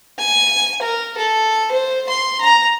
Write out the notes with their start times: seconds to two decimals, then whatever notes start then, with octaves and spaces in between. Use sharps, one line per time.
0.19 G#5
0.82 A#4
1.17 A4
1.72 C5
2.09 C6
2.41 A#5